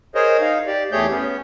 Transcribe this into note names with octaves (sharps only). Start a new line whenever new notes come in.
G#4 A#4 C5 C#5 D#5
D#4 F5
G4 D5
E2 A3 G4 G#4 C#5 G6
B3 C#4